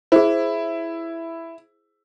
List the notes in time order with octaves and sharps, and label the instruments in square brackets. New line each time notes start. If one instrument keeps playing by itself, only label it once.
[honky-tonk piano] E4 [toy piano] G#4 C5